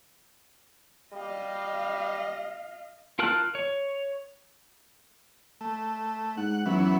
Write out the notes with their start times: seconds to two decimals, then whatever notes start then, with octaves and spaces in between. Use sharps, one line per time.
1.13 G3 D#5 F5
3.19 F4 A#4 A5 F6 F#6
3.55 C#5
5.61 A3
6.37 G#2 F#5
6.66 F#2 E3 F#3 B3